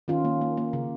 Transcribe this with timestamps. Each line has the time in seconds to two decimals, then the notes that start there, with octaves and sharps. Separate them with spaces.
0.08 D#3 C#4 F4
0.25 A#3
0.41 A#3
0.57 A#3
0.73 C#3